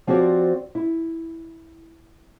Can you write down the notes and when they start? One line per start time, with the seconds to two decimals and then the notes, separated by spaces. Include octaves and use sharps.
0.07 F3 C4 F#4 G4 C#5 D5
0.75 E4